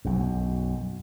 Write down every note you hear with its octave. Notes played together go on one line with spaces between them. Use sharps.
B1 F#2